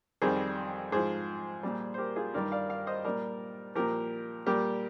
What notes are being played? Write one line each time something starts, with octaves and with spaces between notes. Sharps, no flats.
F2 D#3 G3 G#4 C5
G#2 F3 G#4 C5
A#2 G3
C5
G4 A#4
F4 G#4
G2 D#3 G3 A#4 D5
D5 F5
D5 F5
C5 D#5
A#2 G3 A#4 D5
A#2 F3 G4 A#4
A#2 G3 G4 A#4